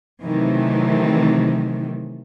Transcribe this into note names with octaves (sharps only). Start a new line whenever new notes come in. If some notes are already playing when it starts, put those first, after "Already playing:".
C3 D#3 E3 F#3 A3